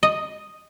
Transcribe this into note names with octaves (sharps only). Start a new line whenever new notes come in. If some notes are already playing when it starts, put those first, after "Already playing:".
D#5